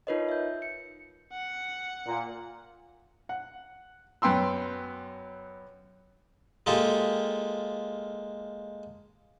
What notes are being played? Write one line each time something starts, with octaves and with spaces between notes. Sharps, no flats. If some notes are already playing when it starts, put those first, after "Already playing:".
D#4 F4 A#4 B4 C#5 D#5
E5 G6
C#7
F#5 C#7
A#2
F#5
F#2 B3 G5 C6 E6
G#3 A#3 F4 G4 A4